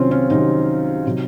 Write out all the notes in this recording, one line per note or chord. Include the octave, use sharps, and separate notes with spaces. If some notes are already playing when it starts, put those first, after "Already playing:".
Already playing: C2 C3 D#3 F#3 C4 C#4 F4
C#4
C2 C3 D#3 F#3 D#4
C3 F#3